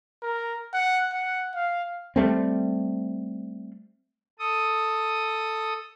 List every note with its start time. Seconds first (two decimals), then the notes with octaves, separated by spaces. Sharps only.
0.23 A#4
0.74 F#5
1.13 F#5
1.55 F5
2.16 G3 A3 C4
4.39 A4 D#6